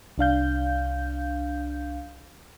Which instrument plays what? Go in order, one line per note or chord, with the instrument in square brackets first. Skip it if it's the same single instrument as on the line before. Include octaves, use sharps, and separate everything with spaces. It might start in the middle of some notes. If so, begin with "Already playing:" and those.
[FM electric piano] C2 D4 F5 G6